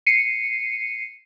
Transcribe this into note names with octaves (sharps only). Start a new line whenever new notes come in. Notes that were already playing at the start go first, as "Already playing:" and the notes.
C7 C#7 D#7